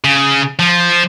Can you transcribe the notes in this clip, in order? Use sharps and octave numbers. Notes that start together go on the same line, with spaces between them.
C#3
F3